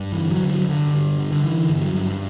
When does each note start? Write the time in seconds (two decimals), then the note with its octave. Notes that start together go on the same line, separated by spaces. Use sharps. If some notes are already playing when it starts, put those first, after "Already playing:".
Already playing: G2
0.12 E3
0.19 D3
0.31 F#3
0.43 D3
0.50 F#3
0.68 G2 D3
0.94 G2
1.19 D3
1.32 D3
1.43 D3 E3
1.69 G2
1.81 F#3
1.94 G2